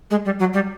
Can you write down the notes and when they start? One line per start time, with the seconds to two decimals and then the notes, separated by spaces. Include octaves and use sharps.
0.10 G#3
0.25 G3
0.39 F#3
0.53 G3